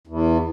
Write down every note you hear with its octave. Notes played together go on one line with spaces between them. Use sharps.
E2